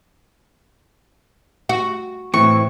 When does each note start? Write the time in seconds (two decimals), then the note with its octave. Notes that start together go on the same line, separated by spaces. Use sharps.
1.69 F#4
2.34 A2 E3 C4 C#6